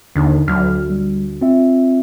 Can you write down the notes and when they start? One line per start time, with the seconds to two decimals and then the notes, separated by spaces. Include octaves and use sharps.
0.16 D#2 D3 D4 D#4
0.48 D2 F#3 F6
0.90 G3
1.41 C4 F4 E5